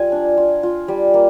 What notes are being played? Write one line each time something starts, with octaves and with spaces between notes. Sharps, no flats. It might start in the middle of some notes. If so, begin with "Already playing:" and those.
Already playing: G3 F4 G#5
D4
F4
F4
G3
A#3